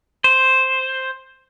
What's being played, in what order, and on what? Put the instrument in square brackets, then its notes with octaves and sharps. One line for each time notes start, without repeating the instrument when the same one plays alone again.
[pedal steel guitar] C5